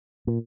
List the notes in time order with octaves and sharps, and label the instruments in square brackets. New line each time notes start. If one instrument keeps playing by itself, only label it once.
[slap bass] A#2